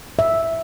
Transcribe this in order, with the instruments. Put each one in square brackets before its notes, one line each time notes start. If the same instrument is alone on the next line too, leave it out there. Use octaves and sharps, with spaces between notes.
[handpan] E5